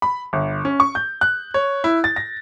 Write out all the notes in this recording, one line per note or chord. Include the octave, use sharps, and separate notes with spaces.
B5
G1
C#4
C#6
G6
F#6
C#5
E4
A6
A#6